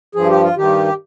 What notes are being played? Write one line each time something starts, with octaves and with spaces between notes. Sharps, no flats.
G2 F3 G#4
G4
F4
G2 D#3 G4